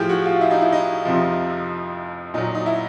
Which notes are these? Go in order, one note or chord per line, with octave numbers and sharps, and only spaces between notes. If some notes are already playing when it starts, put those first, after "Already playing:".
Already playing: A2 F3 G4 G#4
F#4
F4
E4
D#4
E4
D#4
F2 C3 F3
A#2 F#3 D#4
D#4
E4